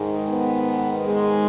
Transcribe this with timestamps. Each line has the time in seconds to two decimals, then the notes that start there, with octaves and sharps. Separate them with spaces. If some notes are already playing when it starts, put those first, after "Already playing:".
Already playing: G#2 D#3 G#3
0.30 B3
1.04 G#3